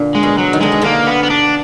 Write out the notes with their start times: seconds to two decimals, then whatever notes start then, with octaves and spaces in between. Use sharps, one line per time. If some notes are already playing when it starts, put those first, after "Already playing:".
Already playing: A#2 D3
0.15 G#3
0.23 B2
0.38 F#3
0.53 D#3
0.61 D3 G#3
0.72 B2
0.82 D3 A#3
1.07 B3
1.23 B3
1.30 D4